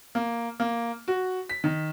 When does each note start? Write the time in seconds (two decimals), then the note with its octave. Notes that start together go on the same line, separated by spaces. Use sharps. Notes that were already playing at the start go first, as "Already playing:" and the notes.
0.15 A#3
0.60 A#3
1.08 F#4
1.49 B6
1.64 D#3